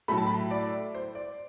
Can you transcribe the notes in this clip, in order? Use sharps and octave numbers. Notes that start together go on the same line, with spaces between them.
A2 F#3 A3 B5
A5
B5
D5
C5
D5